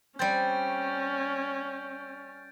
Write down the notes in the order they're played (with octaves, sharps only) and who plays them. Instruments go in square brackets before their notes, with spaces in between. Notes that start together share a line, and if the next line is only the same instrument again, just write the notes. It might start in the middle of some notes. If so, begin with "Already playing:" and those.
[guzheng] G3 C4 [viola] C#4 [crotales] G6 A6 D7